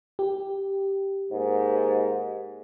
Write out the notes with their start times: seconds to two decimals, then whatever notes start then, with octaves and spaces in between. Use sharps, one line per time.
0.19 G4
1.30 G#2 D#3 A#3